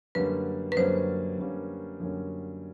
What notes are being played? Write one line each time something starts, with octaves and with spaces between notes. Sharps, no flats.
F#2 D3 G3 A#3 C#4 B4
B4
F#2 D3 G3 A#3 C#4 C5
F#2 D3 G3 A#3 C#4
F#2 D3 G3 A#3 C#4